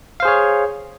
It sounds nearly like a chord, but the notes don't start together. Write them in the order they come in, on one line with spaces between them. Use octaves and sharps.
F5 C5 G#4 C#5